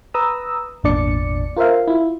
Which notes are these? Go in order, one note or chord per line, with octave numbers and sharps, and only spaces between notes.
B4 A#5 D#6 E6
G#1 E2 A#2 D4 D5 C#7
F4 A#4 C5 E5 F5
E4 F4